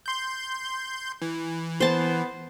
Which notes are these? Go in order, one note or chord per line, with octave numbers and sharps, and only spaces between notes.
C6 G6
E3
B3 C5 A5